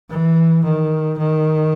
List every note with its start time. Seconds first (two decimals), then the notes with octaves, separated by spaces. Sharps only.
0.10 E3
0.64 D#3
1.18 D#3